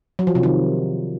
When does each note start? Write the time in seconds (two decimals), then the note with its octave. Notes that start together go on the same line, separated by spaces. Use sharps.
0.19 F#3
0.27 F3
0.35 C3
0.43 D#3